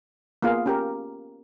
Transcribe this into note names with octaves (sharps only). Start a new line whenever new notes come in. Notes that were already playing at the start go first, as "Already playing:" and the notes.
A#3 B3 F4 G#4 F5
C#4 G4 A#4